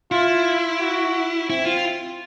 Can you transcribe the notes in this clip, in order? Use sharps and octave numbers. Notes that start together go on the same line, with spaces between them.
E4 F4
F#4
C4 E4
F4